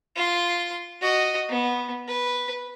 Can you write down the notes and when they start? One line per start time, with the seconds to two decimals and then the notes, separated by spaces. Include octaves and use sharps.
0.16 F4 C6
1.02 F#4 D#5
1.49 B3
2.08 B4